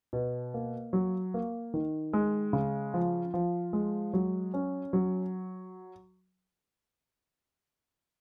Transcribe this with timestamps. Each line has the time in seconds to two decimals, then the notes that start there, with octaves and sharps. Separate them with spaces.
0.13 B2
0.54 A#3
0.93 F#3
1.34 A#3
1.74 D#3
2.13 G#3
2.53 C#3
2.94 F3
3.34 F3
3.73 G#3
4.13 F#3
4.54 C#4
4.93 F#3